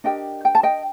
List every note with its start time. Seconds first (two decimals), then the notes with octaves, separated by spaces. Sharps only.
0.04 D4 G4 A#4 D#5 G5
0.45 G5
0.55 A5
0.63 D#5 G5